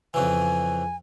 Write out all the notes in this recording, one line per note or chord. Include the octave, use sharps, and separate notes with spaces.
F2 C#3 E3 G#5